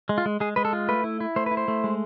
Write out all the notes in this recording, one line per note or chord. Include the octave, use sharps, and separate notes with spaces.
G#3
F4
G#3
G#3 G#4
G#3 B4
A4
F4
A3 B4
E4
E4
A3 C5
E4 B4
C5
A3
G#3